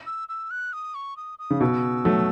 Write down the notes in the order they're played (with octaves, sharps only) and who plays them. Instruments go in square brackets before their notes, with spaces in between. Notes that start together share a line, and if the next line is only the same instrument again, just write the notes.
[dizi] E6
E6
F#6
D#6
C#6
D#6
D#6
[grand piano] C#3
[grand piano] B2 [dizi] E6
[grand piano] F#3 A3